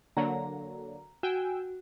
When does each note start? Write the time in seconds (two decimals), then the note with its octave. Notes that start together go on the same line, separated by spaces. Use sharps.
0.17 D3 F#3 A#3 A#5
1.23 F#4 G5 G#5 E6